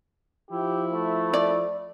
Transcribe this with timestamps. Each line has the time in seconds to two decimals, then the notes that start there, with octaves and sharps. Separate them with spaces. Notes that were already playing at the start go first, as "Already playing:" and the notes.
0.50 F3 E4 G4
0.92 A3
1.34 D5